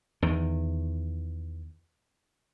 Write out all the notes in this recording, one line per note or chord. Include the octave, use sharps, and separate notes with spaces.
E2 D#3